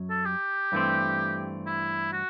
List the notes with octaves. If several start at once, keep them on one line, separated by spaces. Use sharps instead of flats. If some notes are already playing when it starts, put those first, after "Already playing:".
Already playing: F#2 F#3
A4
G4
G2 E3 A3 C4
E4
F#4